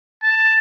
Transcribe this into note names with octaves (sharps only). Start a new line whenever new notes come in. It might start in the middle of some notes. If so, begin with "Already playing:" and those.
A5